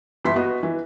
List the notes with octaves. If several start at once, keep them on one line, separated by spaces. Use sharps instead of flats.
G1 E3 E4 B5 C6 B6
B3 F#4 D#5
E3